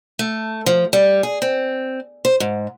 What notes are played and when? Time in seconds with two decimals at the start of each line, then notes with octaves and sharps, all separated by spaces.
0.19 A3
0.66 F3
0.93 G3
1.23 G#4
1.42 C4
2.25 C5
2.40 G#2